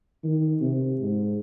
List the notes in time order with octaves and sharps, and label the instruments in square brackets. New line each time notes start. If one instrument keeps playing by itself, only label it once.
[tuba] D#3
C3
G#2